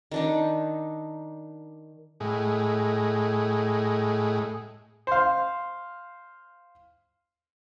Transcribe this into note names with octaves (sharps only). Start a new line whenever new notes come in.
D#3 D4 D#4
A2 G#3
C5 F5